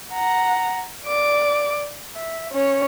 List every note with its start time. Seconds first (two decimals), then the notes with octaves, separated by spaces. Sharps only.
0.13 F#5 A#5
1.05 D5 D6
2.15 E5
2.52 C#4 C#5